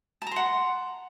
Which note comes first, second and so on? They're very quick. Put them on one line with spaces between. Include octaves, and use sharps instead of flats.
A5 A#5 C6 F#5